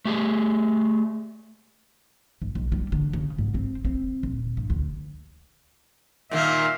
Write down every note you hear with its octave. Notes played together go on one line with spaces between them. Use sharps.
A3 G4 G#4
G#1
B1
G3
D3
C#3
G#2
C4
C4
D#1
G2
D2
A#2 D#3 A#3 E5 F5